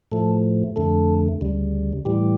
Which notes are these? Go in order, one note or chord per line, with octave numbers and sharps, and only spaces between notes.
A2 F3 A3 A4
F2 D3 A3 A4
D2 C#3 G3
A2 E3 G3 G4